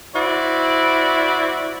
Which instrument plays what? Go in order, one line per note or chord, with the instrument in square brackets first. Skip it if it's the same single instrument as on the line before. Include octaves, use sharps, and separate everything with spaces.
[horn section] E4 F#4 C5 D5